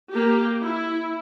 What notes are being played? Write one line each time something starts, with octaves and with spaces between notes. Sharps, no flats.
A#3 G4
E4